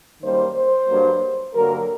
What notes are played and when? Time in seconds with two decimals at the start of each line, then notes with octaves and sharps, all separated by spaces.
0.22 F#2 D#3 G3 A#3 C5
0.55 C5
0.88 G2 F#3 A#3
1.54 G2 D3 F#3 A#3 A#4